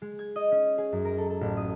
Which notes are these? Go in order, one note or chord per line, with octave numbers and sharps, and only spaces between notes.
G#3
G#6
D#5
C#4
G#4
F#2
A#4
A4
A4
A1
D#6